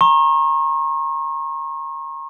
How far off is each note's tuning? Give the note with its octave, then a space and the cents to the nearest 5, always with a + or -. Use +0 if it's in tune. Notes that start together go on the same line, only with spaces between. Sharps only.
A#5 +0 C#6 -40